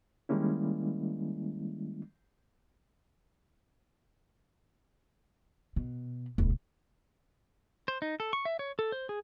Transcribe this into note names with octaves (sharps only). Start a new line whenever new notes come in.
D#3 G3 G#3 A#3 C#4 E4
B2
D#1 C#2
C5
D#4
A4
C#6
E5
C#5
A4
C5
G#4